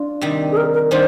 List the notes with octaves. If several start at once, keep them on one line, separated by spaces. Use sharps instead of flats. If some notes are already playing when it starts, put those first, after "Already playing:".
Already playing: D4 F4
C3 D#3 G3
G#4
A#4
A#4
D#3 G3 D4 F4 C5